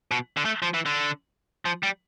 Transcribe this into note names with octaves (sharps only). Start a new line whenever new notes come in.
B2
D3
A3
F3
E3
D3
F3
G3